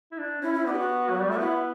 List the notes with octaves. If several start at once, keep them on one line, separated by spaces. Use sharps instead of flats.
E4
D4
C#4 E4
E4
B3 D4
G4
F#4
F#3
G3
A3 F#4
B3 E4